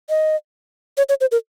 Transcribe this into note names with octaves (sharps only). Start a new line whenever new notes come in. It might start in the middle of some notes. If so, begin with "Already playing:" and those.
D#5
C#5
C#5
C5
A#4